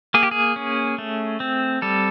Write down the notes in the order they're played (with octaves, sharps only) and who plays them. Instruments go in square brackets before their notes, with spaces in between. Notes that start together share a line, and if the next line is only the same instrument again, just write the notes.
[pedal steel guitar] A#3 G#4
G4
G#4
C#4
A3
C4
G3 A4